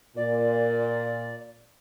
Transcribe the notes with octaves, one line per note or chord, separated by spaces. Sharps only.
A#2 D5